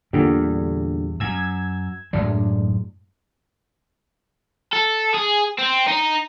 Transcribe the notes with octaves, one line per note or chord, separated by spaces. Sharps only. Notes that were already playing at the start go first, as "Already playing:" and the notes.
E2 A#2 D3 G3
F#2 E6 G#6
F#2 A2 G#3 D4
A4
G#4
C4
D#4